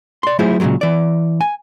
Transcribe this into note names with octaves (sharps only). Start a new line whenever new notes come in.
D5 C6
F#3 A3 E4 F4 G#4 C5
A#2 C#3 F3 F#3 G#3
E3 D5
G#5